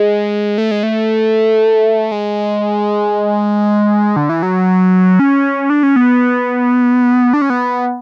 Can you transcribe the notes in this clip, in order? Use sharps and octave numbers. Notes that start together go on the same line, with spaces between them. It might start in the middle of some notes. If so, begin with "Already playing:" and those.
Already playing: G#3
A3
G#3
A3
G#3
D3
E3
F#3
C#4
D4
C#4
B3
D4
C#4
B3